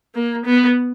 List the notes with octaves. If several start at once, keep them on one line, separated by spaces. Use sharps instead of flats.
A#3
B3